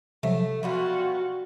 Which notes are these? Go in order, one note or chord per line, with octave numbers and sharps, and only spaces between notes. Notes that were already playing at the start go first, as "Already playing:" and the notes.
C3 F3 F#3 A3
B2 G3 F4 F#4